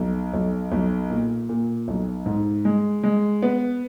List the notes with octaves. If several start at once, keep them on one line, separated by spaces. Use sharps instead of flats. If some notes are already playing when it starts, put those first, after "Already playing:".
Already playing: B1
B1
B1
A#2
A#2
B1
G#2
G#3
G#3
B3